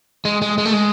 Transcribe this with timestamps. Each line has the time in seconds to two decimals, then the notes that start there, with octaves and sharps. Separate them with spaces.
0.25 G#3
0.42 G#3
0.58 G#3
0.65 A3
0.73 G#3